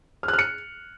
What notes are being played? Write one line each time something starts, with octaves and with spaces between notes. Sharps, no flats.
F6
F#6
F6
C#7